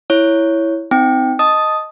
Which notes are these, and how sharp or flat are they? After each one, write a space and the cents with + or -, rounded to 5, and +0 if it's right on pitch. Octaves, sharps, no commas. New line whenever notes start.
E4 +0 C#5 +0
C4 -25 D#4 +10 G5 +0
D#5 +0 A5 +0 D#6 +0